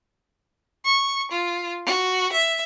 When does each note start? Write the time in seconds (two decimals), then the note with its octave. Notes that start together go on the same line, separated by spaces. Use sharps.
0.85 C#6
1.32 F4
1.86 F#4
2.34 E5